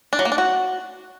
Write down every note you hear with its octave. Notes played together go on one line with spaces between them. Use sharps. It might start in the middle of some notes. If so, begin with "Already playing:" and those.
D4
F#3
A#3
D4
F#4